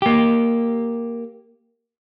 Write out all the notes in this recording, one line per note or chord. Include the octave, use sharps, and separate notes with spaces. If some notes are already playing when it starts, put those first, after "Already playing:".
A#3 G4